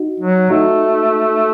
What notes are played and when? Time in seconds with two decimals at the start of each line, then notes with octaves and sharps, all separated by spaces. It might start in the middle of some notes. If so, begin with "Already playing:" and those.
Already playing: D#4 F#4
0.20 F#3
0.50 A3 D#4 F#4